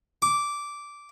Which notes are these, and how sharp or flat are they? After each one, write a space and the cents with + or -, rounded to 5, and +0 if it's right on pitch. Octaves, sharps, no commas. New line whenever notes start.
D6 -10